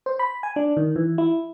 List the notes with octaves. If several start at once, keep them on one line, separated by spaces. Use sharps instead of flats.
C5
B5
G#5
D4
D#3
E3
E4